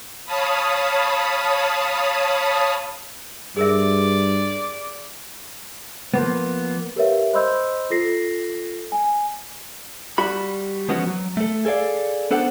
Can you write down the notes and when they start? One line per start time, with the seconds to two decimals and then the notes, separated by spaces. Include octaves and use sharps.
0.25 C#5 F5 A5 B5 D#6
3.56 G2 G#4 A#4 D5 E5
6.14 F3 A#3 B3
6.96 G4 A#4 B4 C#5 E5 F5
7.33 C5 D#5 B5 C6 E6 G6
7.90 F4 A4 A#6 C7
8.92 G#5
10.18 G3 F#4 B5
10.89 F3 G#3 B3 C#4 F#4
11.07 F#3
11.37 A3 A4
11.65 G#4 A4 B4 D5 F5
12.31 B3 D4 A4 C5 F#5